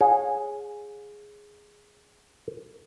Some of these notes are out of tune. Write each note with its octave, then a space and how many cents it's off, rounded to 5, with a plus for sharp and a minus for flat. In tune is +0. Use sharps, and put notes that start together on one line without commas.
G#4 +0 C#5 -15 F5 +45